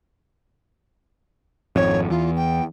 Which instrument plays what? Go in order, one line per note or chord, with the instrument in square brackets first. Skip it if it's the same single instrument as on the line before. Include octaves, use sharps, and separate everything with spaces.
[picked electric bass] G#1 F2 [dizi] C#5
[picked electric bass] E2 [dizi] F4
[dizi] G5